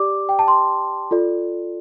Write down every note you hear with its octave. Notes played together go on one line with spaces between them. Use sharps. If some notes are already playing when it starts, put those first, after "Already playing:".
Already playing: G4 D5 D6
G5
A5
C6
F4 A4 D5